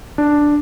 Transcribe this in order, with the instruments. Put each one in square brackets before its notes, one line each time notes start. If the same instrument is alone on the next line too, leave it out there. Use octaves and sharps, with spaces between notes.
[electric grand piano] D4